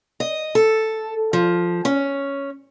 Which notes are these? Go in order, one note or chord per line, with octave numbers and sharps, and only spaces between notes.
D#5
A4
F3
C#4